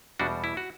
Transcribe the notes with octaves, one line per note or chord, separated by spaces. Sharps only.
E2 B2 G3 D4 F#4
E4
F#4